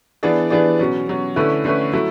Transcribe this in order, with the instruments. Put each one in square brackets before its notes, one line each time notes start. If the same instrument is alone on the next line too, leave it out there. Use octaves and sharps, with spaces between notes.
[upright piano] E3 B3 D4 G#4 D5
E3 B3 D4 G#4 D5
B2 F#3 C#4
B2 F#3 C#4
D3 A3 C#4 E4 B4
D3 A3 C#4 E4 B4
F#3 A3 E4